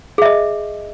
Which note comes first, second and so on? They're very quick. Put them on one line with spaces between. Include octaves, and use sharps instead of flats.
G#4 E5 D#5